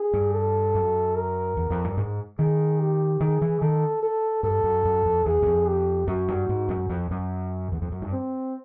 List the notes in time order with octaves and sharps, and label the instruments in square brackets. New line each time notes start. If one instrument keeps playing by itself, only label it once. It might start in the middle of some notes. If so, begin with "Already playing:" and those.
Already playing: [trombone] G#4
[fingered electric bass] G2
[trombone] A4
[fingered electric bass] F#2
[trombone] A#4
[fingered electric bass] E2
F2
G2
G#2
[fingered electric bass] D#3 [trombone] G#4
[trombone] G4
[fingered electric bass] D#3 [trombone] G#4
[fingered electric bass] E3
[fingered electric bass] D#3 [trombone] A4
[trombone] A4
[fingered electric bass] G2 [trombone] A4
[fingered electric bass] F#2
F#2
F2
[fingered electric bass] E2 [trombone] G#4
[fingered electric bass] F#2
F2
[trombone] G4
[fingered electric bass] F#2 [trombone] F#4
[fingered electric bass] G2
G#2
F#2
F2
F#2
E2
F2
F#2
G2
[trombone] C4